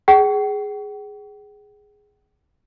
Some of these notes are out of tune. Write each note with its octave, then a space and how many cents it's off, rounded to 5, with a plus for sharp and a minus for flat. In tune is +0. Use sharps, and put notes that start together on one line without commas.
G#4 +0 G5 -45